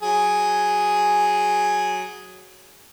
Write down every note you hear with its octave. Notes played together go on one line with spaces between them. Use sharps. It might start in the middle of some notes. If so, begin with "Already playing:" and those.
F#3 G#4